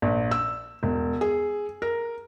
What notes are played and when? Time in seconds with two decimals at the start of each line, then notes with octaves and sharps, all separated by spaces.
0.02 A#1
0.31 E6
0.83 E1
1.21 G#4
1.82 A#4